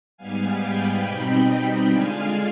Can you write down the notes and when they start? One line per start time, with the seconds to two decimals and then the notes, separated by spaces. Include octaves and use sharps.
0.17 G#2 G3 B3 F5 G#5
0.61 G5 B5
1.04 B2 G3 C4 D#4 G5 B5
1.47 G5 B5
1.90 D3 G#3 D4 F4 F5 G#5